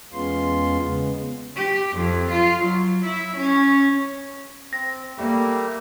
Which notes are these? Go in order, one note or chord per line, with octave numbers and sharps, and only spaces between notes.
E2 G#3 B3 C#4 F4 C6
C#3 G#3 B3
G4
F2
F4
F#3
E4
C#4
C4 A#6
G3 A3 A#3 G4